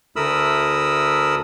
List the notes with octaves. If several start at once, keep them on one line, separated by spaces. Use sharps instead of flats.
D2 A3 A#4 B5 D#6 E6